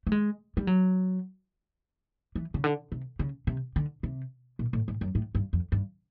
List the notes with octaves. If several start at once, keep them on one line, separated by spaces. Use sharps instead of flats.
A3
G#3
G3
F#3
E3
C#3
D3
C3
C#3
C3
D3
C3
A#2
A2
G#2
F#2
A2
G2
F2
G2